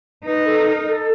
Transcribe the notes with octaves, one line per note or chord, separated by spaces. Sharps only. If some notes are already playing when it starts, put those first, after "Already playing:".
D#4 B4
A4
A#4
A4